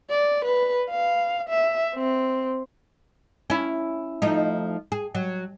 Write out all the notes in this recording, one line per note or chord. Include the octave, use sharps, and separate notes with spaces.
D5
B4
F5
E5
C4
C#4 E4
F3 A3 D#4
G#4
F#3